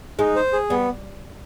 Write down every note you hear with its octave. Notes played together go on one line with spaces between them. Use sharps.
G#3 D#4
C5
G#4
G3 B3